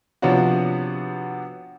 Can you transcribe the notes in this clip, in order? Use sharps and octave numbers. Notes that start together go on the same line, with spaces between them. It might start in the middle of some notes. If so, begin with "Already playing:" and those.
C3 F3 B3 C#4 D4 F#4